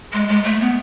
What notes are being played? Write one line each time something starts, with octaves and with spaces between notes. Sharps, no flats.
G#3
G#3
A3
B3